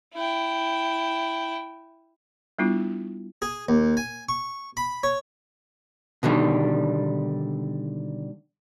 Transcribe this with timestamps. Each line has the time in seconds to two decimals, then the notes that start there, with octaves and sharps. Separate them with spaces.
0.14 E4 G5
2.59 G3 B3 D4 E4 F4
3.42 G#4
3.69 D#2
3.97 G#5
4.29 C#6
4.77 B5
5.03 C#5
6.23 B2 D3 D#3 G3